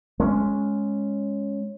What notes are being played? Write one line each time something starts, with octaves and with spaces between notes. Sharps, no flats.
G#3 C#4